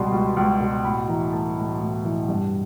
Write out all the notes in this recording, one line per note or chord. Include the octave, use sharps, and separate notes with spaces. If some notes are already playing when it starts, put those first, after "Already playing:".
Already playing: C#2 B2 G3 B5 C6
C#2
C#2
B2
A2 B5
E3 A#5
A3 A5
A2
A2
E3
G2